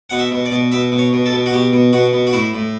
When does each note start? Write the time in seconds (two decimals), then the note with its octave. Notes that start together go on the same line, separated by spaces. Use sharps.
0.10 B2 F#5
0.19 E5
0.31 B2
0.45 D5
0.52 B2
0.72 B2 E5
0.92 B2
0.98 C#5
1.13 B2
1.26 A4
1.32 B2
1.46 F#4
1.52 B2 G4
1.73 B2
1.93 B2 F#4
2.13 B2
2.27 F#4
2.33 A2 E4
2.54 A2